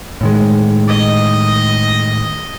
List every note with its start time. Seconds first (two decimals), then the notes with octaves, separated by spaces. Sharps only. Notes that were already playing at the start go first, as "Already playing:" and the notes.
0.21 A2 D#3 G#3
0.88 D#5